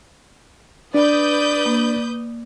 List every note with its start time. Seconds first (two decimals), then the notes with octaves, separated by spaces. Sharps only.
0.94 D4 B4 D5 D#6 G6
1.66 A#3